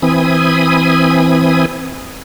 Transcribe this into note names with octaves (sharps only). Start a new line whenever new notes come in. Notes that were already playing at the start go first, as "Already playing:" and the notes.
E3 C4 G#5 B5 D#6